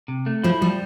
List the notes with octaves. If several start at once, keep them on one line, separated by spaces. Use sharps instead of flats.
C3
A3
F3 E4
F3 G3